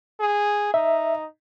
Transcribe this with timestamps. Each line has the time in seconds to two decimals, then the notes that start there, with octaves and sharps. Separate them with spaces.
0.20 G#4
0.74 D#4 E5